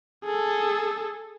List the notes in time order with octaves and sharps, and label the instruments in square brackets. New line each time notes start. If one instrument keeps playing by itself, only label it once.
[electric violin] G#4 A4